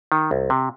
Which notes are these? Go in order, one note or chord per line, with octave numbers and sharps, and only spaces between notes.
D#3
C2
C3